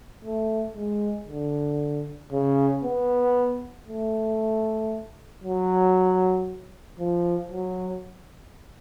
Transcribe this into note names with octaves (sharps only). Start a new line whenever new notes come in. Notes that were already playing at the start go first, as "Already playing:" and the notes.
A3
G#3
D3
C#3
B3
A3
F#3
F3
F#3